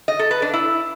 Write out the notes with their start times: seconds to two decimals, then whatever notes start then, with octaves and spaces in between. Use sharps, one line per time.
0.08 D#5
0.19 A4
0.31 B4
0.42 D4
0.53 E4